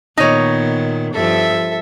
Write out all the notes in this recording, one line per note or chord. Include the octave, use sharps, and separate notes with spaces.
A#2 D#3 B3 D#4 C#5
G2 F3 A4 E5